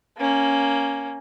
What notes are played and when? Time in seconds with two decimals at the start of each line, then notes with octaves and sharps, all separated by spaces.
0.18 A#3 C#4